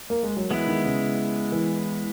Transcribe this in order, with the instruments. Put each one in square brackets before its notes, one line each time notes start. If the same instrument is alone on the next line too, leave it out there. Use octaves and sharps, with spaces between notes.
[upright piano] A#3
G#3
F#3
[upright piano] E3 [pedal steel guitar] G#3 B3 E4
[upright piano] D#3
C#3
E3